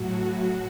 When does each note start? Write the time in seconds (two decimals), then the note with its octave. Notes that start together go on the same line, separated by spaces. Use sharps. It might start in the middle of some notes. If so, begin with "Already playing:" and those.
Already playing: A2 F#3 F#4